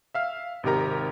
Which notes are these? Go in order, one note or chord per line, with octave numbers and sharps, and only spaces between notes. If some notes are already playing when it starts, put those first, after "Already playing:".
E5 F5 F6
G#1 C3 D#4 G4 A#4 A#5